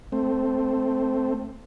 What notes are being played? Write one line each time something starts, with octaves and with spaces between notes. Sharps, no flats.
A3 C4